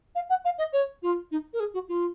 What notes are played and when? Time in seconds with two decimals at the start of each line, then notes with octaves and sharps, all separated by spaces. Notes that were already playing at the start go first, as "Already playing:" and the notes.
0.15 F5
0.29 F#5
0.45 F5
0.58 D#5
0.73 C#5
1.02 F4
1.31 D#4
1.53 A#4
1.60 G#4
1.74 F#4
1.88 F4